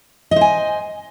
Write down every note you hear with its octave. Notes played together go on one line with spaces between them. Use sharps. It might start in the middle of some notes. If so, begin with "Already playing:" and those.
C5 D#5 G#5